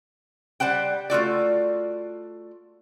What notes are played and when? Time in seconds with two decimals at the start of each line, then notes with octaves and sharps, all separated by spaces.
0.60 G3 C5 F#5 G5
1.10 A3 F4 F#4 D5